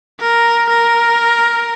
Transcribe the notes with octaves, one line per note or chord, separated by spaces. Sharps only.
A#4
A#4